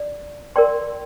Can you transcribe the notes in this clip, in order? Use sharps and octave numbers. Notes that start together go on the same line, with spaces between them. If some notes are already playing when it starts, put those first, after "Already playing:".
Already playing: D5
A#4 D5 G5 C6